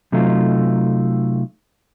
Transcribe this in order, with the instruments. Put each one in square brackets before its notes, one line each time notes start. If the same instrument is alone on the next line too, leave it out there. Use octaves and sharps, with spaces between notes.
[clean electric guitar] C3 F#3 A3 D#4 F4